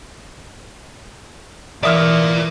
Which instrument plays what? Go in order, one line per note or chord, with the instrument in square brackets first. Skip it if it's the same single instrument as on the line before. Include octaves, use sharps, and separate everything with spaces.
[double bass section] E3 [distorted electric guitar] A#4 D5 [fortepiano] E5 D#6 F6